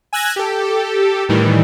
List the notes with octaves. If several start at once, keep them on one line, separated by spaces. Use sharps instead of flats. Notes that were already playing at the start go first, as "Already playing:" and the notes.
G#5 E6 F#6 G#6 A#6
G4 A4
A2 D#3 E3 G3